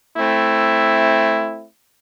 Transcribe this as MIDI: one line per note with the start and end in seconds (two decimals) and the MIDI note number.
0.15 1.65 57
0.15 1.65 60
0.15 1.65 64